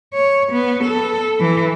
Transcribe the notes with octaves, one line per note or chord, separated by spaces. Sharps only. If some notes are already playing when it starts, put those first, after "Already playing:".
C#5
B3
A4
E3